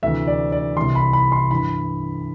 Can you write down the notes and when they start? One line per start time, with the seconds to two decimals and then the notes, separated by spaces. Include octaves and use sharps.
0.03 D2 C3 E3 E5
0.27 D5
0.52 D5
0.77 C2 C3 E3 C6
0.95 B5
1.13 B5
1.32 C6
1.51 G2 E3 B5